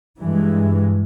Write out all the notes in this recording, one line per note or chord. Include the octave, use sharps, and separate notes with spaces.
G2 E3 G#3